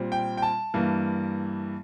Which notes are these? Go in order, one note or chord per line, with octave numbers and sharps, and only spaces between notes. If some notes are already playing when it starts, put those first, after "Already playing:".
Already playing: A#2 G3 C4
G5
G5
A5
G2 E3 A#3